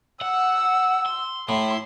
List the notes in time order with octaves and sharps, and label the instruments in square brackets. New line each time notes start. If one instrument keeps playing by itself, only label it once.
[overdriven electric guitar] F#5 [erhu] E6
[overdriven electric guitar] C6
[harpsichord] A2 [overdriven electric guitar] E4 [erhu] C6